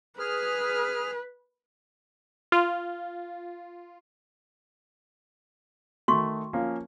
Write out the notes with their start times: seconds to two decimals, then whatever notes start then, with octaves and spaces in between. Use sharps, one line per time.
0.19 G#4 B4 F6
2.52 F4
6.08 D#3 A3 F#4 C6 C#6
6.53 F3 A#3 C#4